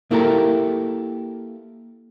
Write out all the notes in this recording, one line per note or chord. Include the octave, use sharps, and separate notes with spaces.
A#3 E4 G4 A4 A#4